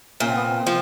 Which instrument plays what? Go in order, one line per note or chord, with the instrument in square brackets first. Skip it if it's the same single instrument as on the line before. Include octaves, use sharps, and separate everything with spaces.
[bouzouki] A#2 [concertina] C#4
[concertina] C4
B3
C4
[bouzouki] F3